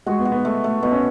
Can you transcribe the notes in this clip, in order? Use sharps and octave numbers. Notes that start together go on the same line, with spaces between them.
G#3 F#4
B3
F#4
B3
A3
A3
B2 B3
C#4